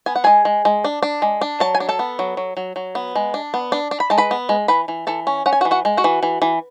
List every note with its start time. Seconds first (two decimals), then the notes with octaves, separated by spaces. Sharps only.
0.06 B3 G#5
0.16 F#5
0.24 G#3 G#4 G#5
0.45 G#3
0.65 G#3
0.84 D4
1.03 D4
1.22 G#3
1.41 D4
1.60 F#3 A5
1.75 G#5
1.80 D4
1.89 A4 A5
1.99 B3
2.19 F#3
2.37 F#3
2.57 F#3
2.76 F#3
2.95 B3
3.16 G#3
3.34 D4
3.54 B3
3.72 D4
3.91 D4
4.00 B5
4.10 G#3 A5
4.18 B4 B5
4.31 B3
4.49 G#3
4.68 E3 B4 B5
4.88 E3
5.07 E3 A4 A5
5.27 C#4
5.46 C#4 F#5
5.53 G#5
5.61 F#4 F#5
5.65 E3
5.71 F#4 F#5
5.85 G#3
5.97 F#4 F#5
6.04 E3
6.23 E3
6.42 E3